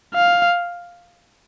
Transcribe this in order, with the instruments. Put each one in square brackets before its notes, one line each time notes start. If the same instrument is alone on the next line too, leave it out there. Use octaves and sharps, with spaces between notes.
[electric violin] F5